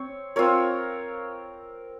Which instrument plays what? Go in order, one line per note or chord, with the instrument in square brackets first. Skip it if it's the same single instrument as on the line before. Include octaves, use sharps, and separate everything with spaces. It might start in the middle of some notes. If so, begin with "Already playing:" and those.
Already playing: [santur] C4 C#5
C4 F4 A#4 C#5